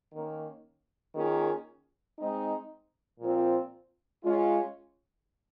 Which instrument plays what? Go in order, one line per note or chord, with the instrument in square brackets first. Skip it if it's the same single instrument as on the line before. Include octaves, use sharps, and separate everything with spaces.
[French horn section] D#3 A#3 C#4
D#3 A#3 C#4 F4 G#4
G#3 C4 D#4
A#2 F3 C4 F4 C5
G#3 C#4 F4